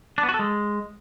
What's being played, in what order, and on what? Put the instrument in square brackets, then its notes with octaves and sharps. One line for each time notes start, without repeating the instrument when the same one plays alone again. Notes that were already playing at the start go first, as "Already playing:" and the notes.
[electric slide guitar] D4
B3
F#4
A4
G#3